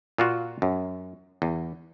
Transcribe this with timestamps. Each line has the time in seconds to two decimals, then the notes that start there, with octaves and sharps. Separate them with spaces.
0.18 A#2 F4 F#4
0.62 F#2
1.42 E2